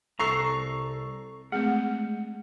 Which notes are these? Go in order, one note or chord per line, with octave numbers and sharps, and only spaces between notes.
C2 A4 A#5 C#6 C7
G#3 A3 C4 G#4 F#5